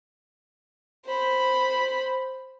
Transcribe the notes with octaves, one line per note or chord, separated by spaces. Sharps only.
C5 B5